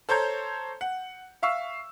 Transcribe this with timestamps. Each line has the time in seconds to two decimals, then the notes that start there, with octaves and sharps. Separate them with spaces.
0.09 A4 C5 C#5 A#5 G6
0.81 F#5
1.43 E5 F5 C#6 E6